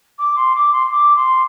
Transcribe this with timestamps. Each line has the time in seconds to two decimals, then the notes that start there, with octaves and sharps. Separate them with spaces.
0.18 D6
0.36 C6
0.55 D6
0.72 C6
0.86 C6
0.91 D6
1.15 C6